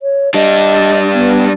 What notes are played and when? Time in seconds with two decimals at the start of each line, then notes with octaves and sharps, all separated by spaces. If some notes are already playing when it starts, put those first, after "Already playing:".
0.02 C#5
0.34 G3 D4 D#5
1.14 B3